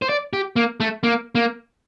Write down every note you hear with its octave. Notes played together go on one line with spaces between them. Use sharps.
C5
D5
G4
A#3
A3
A#3
A#3